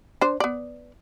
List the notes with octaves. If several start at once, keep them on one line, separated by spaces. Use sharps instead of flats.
D4 C5
B3 D5